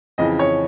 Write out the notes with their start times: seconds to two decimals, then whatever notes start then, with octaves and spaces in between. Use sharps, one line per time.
0.18 F2 C#3 E3 D#5
0.39 C#5